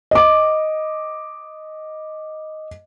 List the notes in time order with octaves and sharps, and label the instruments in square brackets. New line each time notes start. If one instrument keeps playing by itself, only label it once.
[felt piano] D#5 D6